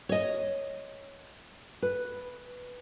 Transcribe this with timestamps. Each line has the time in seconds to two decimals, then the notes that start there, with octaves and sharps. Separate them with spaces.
0.09 C#5 D#5
1.82 B4